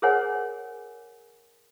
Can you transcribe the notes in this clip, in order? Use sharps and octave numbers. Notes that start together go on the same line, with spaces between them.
G#4 A#4 C5 C#5 F#5 G#5